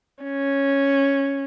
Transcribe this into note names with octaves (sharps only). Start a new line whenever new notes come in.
C#4